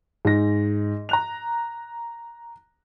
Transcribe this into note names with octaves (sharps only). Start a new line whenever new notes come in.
G#2 A#6
A#5 F#6 F7